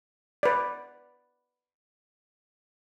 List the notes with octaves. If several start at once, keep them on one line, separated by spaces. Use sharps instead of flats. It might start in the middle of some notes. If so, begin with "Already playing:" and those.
B4 D5